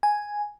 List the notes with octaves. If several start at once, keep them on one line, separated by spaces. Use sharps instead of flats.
G#5